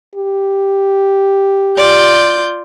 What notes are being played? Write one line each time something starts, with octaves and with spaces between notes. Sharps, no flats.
G4
F4 D5 G6